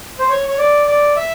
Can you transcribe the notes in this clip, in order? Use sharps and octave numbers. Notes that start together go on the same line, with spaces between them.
C5
C#5
C#5
D5
D5
E5